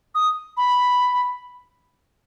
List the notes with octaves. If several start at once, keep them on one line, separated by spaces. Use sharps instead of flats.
D#6
B5